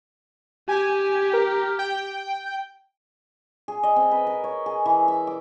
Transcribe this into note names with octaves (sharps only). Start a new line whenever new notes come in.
G4 G#5
A#4
G5
G#4
D#5
C4
B4
A#4
C#5
G#4
E3
E5
D6